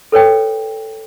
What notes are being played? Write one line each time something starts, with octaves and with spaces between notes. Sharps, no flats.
A4 B4 C#5 G5